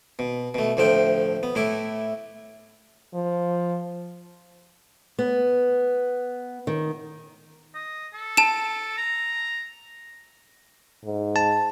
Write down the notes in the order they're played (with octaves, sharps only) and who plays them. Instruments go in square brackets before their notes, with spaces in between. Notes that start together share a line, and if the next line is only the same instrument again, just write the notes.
[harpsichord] B2
B2 A3
D2 A2 F3 A3 G5
B3
A2 A3 E4 D6
[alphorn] F3
[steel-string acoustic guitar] B3
D#3
[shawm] D#5
A4
[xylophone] A5 E7
[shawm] A#5
[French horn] G#2
[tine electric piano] A5